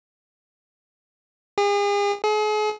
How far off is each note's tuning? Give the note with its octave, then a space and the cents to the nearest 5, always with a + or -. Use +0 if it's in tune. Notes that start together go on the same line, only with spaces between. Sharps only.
G#4 -40
G#4 +40